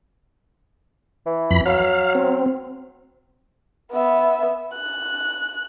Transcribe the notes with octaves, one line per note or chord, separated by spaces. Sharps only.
E3
F2 B5
F#3 F5
C4
B3 E5
F#6